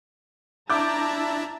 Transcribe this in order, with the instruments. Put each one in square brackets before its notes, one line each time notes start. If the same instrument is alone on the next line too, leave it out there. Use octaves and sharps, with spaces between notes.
[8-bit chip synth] D4 E4 [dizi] E5 [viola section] A5 A#5 [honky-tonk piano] D6 G6